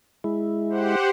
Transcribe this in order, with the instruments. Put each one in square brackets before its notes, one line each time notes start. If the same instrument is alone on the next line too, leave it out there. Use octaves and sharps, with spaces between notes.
[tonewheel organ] G#3 E4
[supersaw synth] G4 C5 F#5